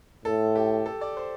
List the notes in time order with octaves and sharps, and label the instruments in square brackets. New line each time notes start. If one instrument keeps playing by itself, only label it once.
[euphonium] A2 [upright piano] A4
[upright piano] G4
A4
D5
C5